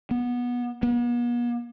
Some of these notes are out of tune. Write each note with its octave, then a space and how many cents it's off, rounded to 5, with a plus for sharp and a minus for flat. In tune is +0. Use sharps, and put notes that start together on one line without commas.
B3 -20
B3 -45